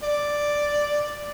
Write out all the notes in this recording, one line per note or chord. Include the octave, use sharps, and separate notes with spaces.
D5